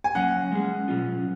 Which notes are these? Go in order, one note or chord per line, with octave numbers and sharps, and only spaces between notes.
G#5
F#3 A#3 C#4 F#5
G#3 C#4 G#4
B2 F#3 C#4 F4